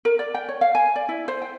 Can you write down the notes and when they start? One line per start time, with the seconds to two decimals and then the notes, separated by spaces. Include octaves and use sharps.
0.05 A#4
0.19 D5
0.34 G5
0.49 C#5
0.61 F5
0.75 G#5
0.96 D5
1.09 E4
1.28 C5
1.42 G5